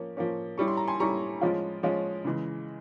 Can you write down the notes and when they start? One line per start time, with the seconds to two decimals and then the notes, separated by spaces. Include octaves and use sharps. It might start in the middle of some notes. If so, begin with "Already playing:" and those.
Already playing: F3 A#3 C#4
0.17 F3 A#3 C#4
0.58 G3 C#4 E4 C#6
0.68 C6
0.77 A#5
0.88 G#5 C6
1.00 G3 C#4 E4 A#5 C#6
1.41 F3 G#3 C#4 F4
1.83 F3 G#3 C#4 F4
2.25 C#3 E3 G#3